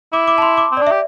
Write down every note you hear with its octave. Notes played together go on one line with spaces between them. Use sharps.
E4 D6
D6
A5
C6
D6
C4
D4 D5
G4 E5